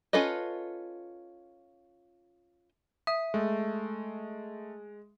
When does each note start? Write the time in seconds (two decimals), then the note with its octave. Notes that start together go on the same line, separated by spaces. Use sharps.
0.13 C#4 F4 A4 B4 D#5
3.07 E5 D#6
3.34 G#3 A3